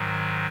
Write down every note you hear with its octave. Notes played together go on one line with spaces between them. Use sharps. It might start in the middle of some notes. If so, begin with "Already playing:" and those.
Already playing: G#2 D#3 F#3